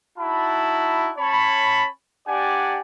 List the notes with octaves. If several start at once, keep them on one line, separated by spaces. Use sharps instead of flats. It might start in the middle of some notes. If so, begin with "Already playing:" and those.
D#4 E4 F#4 A5 B5
C#4 C#5 A5 B5
D4 G4 D5 F#5 G#5